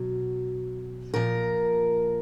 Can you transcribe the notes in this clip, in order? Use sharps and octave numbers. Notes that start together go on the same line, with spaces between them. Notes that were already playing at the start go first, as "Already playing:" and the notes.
Already playing: B2 F#3
A#2 F3 A#4